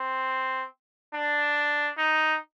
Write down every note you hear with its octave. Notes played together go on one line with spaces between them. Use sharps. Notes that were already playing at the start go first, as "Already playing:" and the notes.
Already playing: C4
D4
D#4